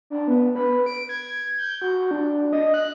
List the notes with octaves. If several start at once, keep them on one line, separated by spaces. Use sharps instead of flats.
D4
B3
B4
D7
G#6
G6
F#4
D4
D#5
F#6